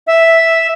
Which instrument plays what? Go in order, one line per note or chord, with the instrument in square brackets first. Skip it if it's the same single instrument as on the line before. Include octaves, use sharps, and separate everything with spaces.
[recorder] E5